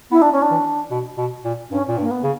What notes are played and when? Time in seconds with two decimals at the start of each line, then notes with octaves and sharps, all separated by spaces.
0.11 B3 E4
0.22 D4
0.32 C#4
0.42 D4
0.51 E3
0.91 B2
1.17 B2
1.44 A#2
1.70 G2 C#4
1.88 A#2
1.98 G2
2.01 A#3
2.11 B3
2.24 C#3